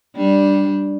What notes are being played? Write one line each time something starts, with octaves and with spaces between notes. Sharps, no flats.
G3 D4